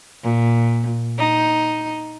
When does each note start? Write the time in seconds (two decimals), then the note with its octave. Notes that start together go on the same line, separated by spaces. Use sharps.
0.23 A#2
1.18 D#4